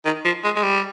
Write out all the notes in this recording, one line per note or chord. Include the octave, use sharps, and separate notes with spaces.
D#3
F3
G#3
G#3
G3